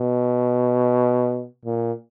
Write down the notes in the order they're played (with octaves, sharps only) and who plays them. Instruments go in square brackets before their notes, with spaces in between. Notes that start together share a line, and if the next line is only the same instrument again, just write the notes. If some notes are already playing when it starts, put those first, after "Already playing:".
Already playing: [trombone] B2
A#2